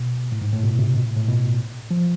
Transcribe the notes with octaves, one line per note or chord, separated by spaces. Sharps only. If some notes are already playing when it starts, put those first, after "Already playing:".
Already playing: B2
A2
G#2
A2
B2
C3
B2
A2
A2
B2
F3